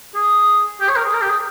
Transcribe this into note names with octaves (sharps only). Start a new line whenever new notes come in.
G#4
G4
C#5
A#4
G#4
A#4
G4
G#4